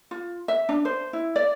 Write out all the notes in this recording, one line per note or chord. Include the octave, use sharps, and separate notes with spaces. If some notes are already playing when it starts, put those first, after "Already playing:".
F4
E5
D4
C5
E4
D5